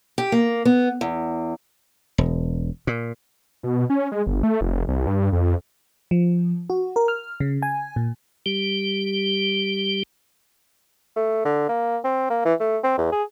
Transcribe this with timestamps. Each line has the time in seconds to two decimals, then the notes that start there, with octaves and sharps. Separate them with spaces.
0.18 G4
0.32 A#3
0.65 B3
1.01 E2
2.18 E1
2.87 A#2
3.63 B2
3.90 C#4
4.12 G#3
4.27 G1
4.43 A3
4.61 F1
4.88 C2
5.07 G2
5.32 F2
6.11 F3
6.70 F#4
6.96 A#4
7.08 F6
7.40 C#3
7.62 G#5
7.96 A#2
8.46 G3 G4
11.16 A3
11.45 D3
11.69 A#3
12.05 C4
12.30 A#3
12.45 E3
12.60 A3
12.84 C4
12.98 E2
13.12 G#4